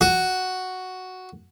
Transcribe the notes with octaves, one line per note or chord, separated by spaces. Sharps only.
F#4